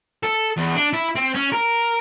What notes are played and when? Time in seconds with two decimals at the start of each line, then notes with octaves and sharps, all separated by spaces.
0.23 A4
0.57 E2
0.75 D4
0.93 E4
1.15 C4
1.34 C#4
1.52 A#4